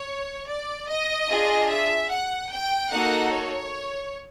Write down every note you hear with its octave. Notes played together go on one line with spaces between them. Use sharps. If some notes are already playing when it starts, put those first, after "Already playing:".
Already playing: C#5
D5
D#5
D4 F4 G#4
E5
F#5
G5
A#3 D#4 F#4 A4 F#5
C#5